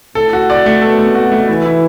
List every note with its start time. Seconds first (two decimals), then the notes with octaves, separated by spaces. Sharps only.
0.15 A2 A4
0.33 F#4
0.50 D5
0.66 A3
0.82 B2 A4
0.99 A3
1.15 F#4
1.32 A3
1.48 E3 E4
1.65 E4